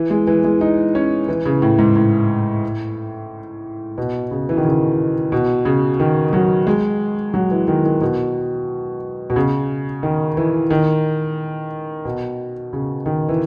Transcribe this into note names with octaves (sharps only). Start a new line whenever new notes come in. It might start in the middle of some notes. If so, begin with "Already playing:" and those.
Already playing: E3
G#3
E3
G#3
D#4
C#4
E3
C#3
A2
G#2
A2
B2
C#3
E3
D#3
C#3
B2
C#3
D#3
F#3
G#3
F#3
E3
D#3
D#3
B2
B2
C#3
D#3
E3
D#3
B2
C#3
D#3
E3